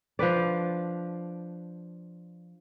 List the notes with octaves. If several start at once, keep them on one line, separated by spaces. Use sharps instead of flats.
F3 D4 B4 D5